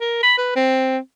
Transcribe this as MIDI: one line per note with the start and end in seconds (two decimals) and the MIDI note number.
0.01 0.18 70
0.23 0.34 83
0.38 0.54 71
0.56 0.98 60